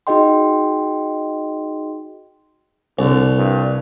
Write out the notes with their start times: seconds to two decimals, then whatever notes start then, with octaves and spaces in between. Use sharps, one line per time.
0.07 D#4 F#4 G#4 D#5 G5 C6
2.99 C2 D3
3.36 G2